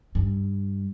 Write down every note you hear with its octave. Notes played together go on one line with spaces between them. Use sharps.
G2